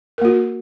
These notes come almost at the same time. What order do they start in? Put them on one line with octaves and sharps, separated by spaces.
A#4 A#3 F#4